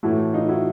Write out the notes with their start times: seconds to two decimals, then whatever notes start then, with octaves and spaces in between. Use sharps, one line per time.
0.03 A2 E3 A3 E4 F#4
0.34 D#4 F4
0.49 E4 F#4